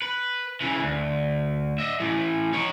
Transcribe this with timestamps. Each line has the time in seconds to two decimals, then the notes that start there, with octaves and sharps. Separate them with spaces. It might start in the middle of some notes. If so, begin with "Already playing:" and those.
0.02 B4
0.61 C#3 E3
0.82 D2
1.79 D#5 E5
2.00 A2 E3
2.53 D#4 C#5